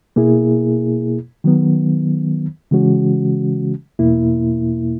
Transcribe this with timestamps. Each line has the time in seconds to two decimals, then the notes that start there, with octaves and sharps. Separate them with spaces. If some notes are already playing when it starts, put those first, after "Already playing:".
0.16 B2 A#3 E4 G#4
1.44 D#3 F#3 B3
2.71 C#3 E3 G#3 C#4 F#4
3.99 E2 B2 A#3 E4